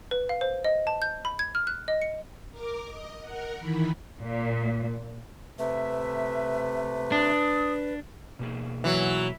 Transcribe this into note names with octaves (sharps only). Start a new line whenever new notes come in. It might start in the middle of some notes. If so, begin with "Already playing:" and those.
B4
F5
C5
D#5
A5
G6
B5
G#6
F6
F#6
D#5
C#7
A#4 D6
D#5
A#4 F#5
D#3 E3 B5
A#2
C3 A3 B4 E5
D4 D#6
B2 A#3 G#4
E3 F#3